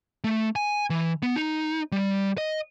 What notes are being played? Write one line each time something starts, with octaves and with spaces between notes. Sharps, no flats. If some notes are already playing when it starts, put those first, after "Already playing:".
A3
G#5
E3
B3
D#4
G3
D#5